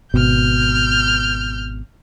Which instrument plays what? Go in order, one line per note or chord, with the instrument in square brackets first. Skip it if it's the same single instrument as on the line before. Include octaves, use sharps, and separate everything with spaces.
[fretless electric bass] G#1 B2 [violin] F6 G6